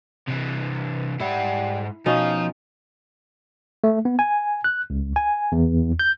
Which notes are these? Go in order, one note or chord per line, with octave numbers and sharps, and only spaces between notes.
C3 E3
G#2 G3 E4 F#5
B2 F3 C#4 D#4 F5
A3
B3
G#5
F#6
C#2
G#5
E2
G6